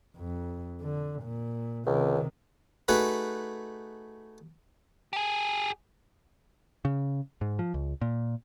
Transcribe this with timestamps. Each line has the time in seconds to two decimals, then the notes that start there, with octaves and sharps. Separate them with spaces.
0.17 F2
0.81 D3
1.22 A#2
1.86 C#2 C3 D#3
2.88 A3 D#4 F#4 G#4 B4
5.13 G4 G#4
6.85 C#3
7.41 G#2
7.59 F3
7.74 C#2
8.02 A#2